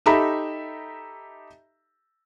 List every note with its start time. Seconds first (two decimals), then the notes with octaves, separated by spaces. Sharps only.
0.06 D#4 G4 A4 E5 A#5 B5